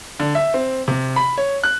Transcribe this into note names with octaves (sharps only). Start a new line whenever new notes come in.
D3
E5
C4
C3
B5
C#5
F#6